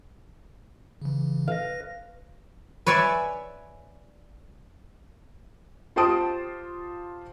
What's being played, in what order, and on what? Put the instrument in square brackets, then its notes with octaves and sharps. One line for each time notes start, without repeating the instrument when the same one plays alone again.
[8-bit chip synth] C#3 E3
[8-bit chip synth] B4 A#6 [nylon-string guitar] F5
[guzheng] B4 C#5 D5 E5 G#5
[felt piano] F4 G4 C5 A5 D#6 D7